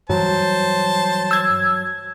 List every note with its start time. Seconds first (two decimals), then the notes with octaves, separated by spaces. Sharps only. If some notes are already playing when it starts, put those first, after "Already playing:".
0.10 G2 E3 F#3 G3 C5 A5
1.31 E6 G#6